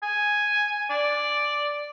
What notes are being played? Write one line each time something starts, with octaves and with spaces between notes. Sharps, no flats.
G#5
D5